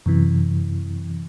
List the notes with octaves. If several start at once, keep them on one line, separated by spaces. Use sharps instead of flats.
F#2 C3 E3